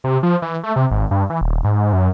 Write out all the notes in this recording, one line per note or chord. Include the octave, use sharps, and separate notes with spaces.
C3
F3
E3
A3
C3
G#1
G2
E3
D#1
G#2
F#2